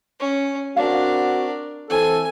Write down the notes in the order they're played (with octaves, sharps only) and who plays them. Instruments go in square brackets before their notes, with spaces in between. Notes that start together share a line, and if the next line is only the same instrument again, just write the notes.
[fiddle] C#4
[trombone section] C4 F#4 [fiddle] D4 A#4 [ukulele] F5
[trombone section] E3 C4 [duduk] A4 [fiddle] G#5